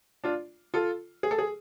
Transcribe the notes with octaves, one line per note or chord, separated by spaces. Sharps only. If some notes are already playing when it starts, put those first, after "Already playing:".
D4 F4
F4 A4
G#4
A4
G#4